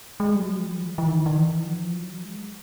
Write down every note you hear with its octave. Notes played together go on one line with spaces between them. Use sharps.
G#3
G3
F#3
F3
E3
E3
D#3
D#3
E3
F3
F#3
G#3